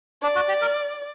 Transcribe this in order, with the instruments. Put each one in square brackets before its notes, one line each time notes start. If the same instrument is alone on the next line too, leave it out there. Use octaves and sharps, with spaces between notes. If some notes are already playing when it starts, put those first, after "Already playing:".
[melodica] D4 [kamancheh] D5
[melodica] F#4
G4
A#4